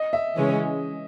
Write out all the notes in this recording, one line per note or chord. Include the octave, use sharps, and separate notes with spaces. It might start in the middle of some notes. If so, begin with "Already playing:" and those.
Already playing: D#5
E5
C#3 E3 G#3 C#4